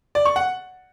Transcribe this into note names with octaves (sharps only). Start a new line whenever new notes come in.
D5
C#6
F#5